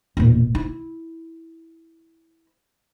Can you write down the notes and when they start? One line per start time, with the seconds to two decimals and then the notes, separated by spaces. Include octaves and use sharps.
0.17 E1 A#2
0.55 E4